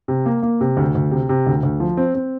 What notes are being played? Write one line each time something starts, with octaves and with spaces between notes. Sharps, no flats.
C3
A#3
A#3
C3
D2
D2
C3
C3
D2
D2
F3
C4
C4